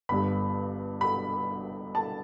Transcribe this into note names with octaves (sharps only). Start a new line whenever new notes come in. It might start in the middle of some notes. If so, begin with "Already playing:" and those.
G1 G2 G3 B5
B5
A5